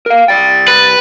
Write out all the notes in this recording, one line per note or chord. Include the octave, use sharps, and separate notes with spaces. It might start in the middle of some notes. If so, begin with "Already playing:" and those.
A#4 F5
C2 D5 G5 A6
B4